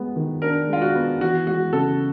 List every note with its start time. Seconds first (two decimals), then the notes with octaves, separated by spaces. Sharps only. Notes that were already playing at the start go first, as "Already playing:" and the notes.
Already playing: G#3 B3
0.16 D#3
0.42 D4 A#4
0.69 G#3 F4
0.82 F#4
0.95 B3
1.20 E3 F#4
1.47 G#3 F#4
1.73 C#3 A4